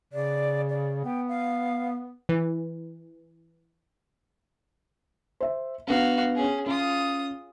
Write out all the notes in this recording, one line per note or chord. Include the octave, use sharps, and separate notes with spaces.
C#3 D5
D5
B3 G5
F5
E3
C5 E5
B3 D4 F#4 F5
C#4 G#4
C#4 F4 D#6